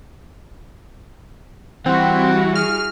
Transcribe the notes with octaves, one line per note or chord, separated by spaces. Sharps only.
E3 G3 C4 E4 F#4 F#5
G#4 F6